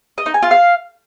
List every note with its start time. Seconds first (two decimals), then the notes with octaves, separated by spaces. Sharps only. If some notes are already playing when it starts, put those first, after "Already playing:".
0.18 D#5
0.26 D#4
0.34 G#5
0.42 F4
0.51 F5